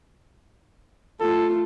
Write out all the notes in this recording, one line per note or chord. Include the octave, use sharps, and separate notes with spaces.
A3 F4 A4